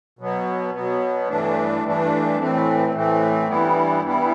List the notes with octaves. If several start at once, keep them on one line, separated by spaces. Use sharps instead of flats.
B2 F#3 B3
B2 F#3 B3
G2 E3 A3 D4
G2 E3 A3 D4
A2 E3 A3 C4
A2 E3 A3 C4
G2 E3 G3 B3 E4
G2 E3 G3 B3 E4